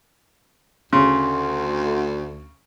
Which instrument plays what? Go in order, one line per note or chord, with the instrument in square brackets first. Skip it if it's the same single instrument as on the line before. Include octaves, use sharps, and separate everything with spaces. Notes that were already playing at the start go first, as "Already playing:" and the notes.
[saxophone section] D2 [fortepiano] C#3 [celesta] C6